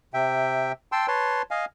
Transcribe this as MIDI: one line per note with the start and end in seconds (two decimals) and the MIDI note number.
0.14 0.72 48
0.14 0.72 76
0.14 0.72 79
0.92 1.07 79
0.92 1.07 81
0.92 1.07 84
0.92 1.07 88
1.08 1.42 71
1.08 1.42 73
1.08 1.42 81
1.08 1.42 84
1.51 1.65 75
1.51 1.65 77
1.51 1.65 80